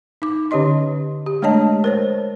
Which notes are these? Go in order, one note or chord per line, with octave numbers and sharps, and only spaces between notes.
D#4 D6
D3 C#4 G4 C#5 D#5 C6
G4
G#3 A3 D4 C#5 D#5 A5
A#4 C5 C#5